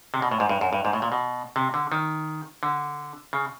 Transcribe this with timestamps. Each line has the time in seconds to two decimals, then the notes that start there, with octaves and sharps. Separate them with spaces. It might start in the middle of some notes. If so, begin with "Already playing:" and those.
0.14 C3
0.22 B2
0.31 A2
0.40 G#2
0.49 G2
0.61 F#2
0.73 G2
0.85 G#2
0.93 A2
1.02 A#2
1.12 B2
1.56 C3
1.74 D3
1.92 D#3
2.63 D3
3.33 C#3